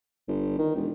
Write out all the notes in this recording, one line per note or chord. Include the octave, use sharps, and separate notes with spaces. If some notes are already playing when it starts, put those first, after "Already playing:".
G1
D#3
E1